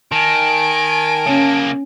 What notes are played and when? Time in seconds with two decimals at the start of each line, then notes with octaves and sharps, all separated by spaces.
0.12 D#3 G#5 A5 D7
1.26 C#3 A#3 C#4 C#5